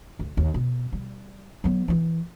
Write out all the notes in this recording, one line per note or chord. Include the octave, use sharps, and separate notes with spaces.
D2
D#2
B2
G3
F#3 B3
E3 E4